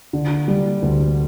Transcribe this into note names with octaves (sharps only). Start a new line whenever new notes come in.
D3
G3
D2